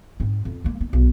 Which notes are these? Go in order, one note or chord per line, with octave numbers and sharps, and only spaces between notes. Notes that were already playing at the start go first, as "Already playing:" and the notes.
G#2 C4
F2
G#3 A#3
A#3 D#4
B1 C3